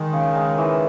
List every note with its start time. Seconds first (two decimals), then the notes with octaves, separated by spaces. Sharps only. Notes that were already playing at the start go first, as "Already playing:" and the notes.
Already playing: D#3 G#3
0.13 C#3
0.35 G#3
0.58 E3